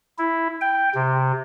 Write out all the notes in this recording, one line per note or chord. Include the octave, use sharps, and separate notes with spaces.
E4
G5
C3